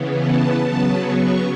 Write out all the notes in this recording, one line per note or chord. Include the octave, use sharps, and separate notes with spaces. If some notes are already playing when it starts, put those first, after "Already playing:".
Already playing: C#3 E3 B3
A5
C#3 F#3 B3 A5
C#6